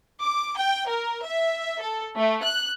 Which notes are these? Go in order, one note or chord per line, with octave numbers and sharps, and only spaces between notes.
D6
G5
A#4
E5
A4
A3
F#6